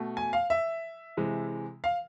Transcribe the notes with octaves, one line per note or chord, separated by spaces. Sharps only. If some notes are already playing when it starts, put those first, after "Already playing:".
Already playing: B2 A3
G#5
F5
E5
C3 E3 G#3
F5